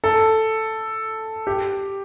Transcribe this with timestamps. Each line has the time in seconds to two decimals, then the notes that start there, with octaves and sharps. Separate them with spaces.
0.04 A4
1.47 G4